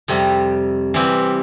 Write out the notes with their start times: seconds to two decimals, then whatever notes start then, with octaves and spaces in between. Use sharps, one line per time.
0.08 F2 C3 G3
0.94 E3 G3 C4 G4